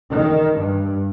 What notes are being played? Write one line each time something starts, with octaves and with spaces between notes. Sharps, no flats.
D#3
G2